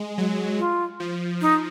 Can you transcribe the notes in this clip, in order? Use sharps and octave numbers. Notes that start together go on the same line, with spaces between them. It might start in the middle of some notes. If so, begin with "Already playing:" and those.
Already playing: G#3
F#3
F4
F3
D#4